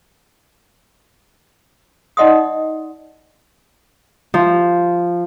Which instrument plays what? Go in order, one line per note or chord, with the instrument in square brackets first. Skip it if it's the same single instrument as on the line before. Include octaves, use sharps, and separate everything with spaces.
[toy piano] D#4 D5 D#5 F#5 C6 D#6
[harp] F3